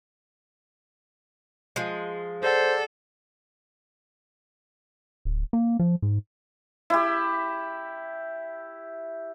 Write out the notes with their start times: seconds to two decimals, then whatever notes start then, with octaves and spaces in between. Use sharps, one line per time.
1.76 F3 G#3
2.43 G#4 A4 C5 D5 F#5
5.25 D1
5.53 A#3
5.79 F3
6.02 G#2
6.90 E4 G4